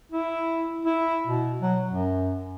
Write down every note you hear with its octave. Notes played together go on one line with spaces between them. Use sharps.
E4
E4
B2
F#3
F#2